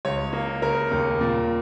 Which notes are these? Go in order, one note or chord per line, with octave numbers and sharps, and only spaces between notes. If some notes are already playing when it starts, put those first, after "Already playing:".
C#2 C#5
A#3
C#3 A#4
D#2
A#2